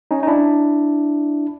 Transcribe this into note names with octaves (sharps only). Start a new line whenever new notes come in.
C#4 D#4
D#4
D4 E4